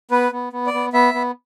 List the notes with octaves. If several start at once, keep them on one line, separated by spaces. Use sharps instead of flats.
B3 B4
B3
B3
D5
B3
B3 E5
B3